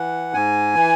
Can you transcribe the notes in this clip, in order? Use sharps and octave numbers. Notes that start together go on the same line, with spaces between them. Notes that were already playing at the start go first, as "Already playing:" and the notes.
Already playing: E3 F#5
G#2 G#5
E3